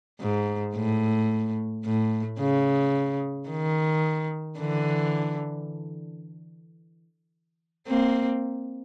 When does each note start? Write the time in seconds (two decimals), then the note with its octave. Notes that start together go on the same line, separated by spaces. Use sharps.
0.21 G#2
0.75 A2
1.85 A2
2.39 C#3
3.49 D#3
4.59 D3 E3
7.87 A#3 C4